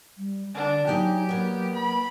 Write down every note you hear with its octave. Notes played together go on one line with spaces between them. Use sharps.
G3
D3 D4
F#3 D#4 G4 G5 G#5
A#3 B3
B5